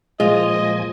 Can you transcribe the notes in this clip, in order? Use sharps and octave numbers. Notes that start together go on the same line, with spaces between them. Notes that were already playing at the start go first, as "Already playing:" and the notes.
A#2 F3 G#3 F4 D#5 G#5